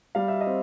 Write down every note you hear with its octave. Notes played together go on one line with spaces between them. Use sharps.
G3 F5
E5
D#5
C4